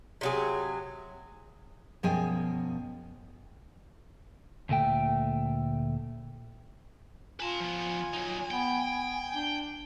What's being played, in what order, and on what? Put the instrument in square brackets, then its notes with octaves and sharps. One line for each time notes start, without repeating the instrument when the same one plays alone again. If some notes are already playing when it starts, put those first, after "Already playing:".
[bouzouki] C3 F#3 G#4
[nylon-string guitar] F#2 B2 F3 G#4 G5 G#5
[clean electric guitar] D2 A#2 A3 G5
[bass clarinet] F4 [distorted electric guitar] B4 A5 [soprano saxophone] G#5
[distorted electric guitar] F3 B3
F#3 D#4
[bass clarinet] B3 [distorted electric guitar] G5
[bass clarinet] B3
D4